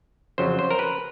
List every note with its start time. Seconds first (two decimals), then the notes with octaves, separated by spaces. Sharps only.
0.38 F2 C#3 F#3 C5
0.59 C5
0.71 A#4
0.79 B4